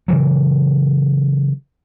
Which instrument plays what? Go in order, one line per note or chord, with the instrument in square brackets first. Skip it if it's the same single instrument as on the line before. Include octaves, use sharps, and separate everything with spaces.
[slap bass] C#3 E3 F#3